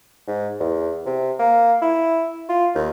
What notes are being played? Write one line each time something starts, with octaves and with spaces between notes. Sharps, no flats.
G#2
E2
C3
A#3
E4
F4
D#2